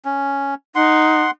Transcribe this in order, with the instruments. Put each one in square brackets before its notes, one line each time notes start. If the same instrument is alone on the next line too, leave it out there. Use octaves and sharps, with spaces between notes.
[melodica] C#4
[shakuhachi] D#4 [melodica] F#5 C6